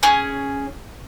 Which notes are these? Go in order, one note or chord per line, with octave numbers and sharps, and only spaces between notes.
C#4 G#4